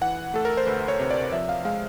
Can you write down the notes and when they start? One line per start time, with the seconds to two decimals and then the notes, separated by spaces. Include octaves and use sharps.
0.01 E3 F#5
0.34 A3 A4
0.45 A#4
0.57 C5
0.67 D2 B4
0.88 C#5
0.99 C3
1.11 D5
1.32 F3 E5
1.49 F5
1.65 G#3 F5